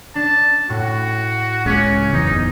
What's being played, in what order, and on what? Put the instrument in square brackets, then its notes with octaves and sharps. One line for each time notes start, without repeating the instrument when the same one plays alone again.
[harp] D4 [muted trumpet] A5
[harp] A2 [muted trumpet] F#4
[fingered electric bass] C#2 C#3 [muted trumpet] C#4 [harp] D6 F#6
[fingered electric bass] F#1 E2 [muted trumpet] D#4